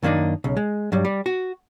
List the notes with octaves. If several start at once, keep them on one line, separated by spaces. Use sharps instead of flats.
F#2 D#3 A#3 B3 D4 D#4
B1 C#3
G#3
G2 F#3 G3
G3
F#4